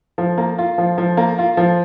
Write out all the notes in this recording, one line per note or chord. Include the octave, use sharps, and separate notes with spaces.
F3
A#3
F4
F3
F3
A#3
F4
F3